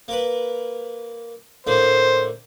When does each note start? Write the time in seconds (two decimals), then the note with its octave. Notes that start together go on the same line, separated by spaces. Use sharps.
0.08 A#3 A#4 B4
1.67 A2 D3 A#3 C5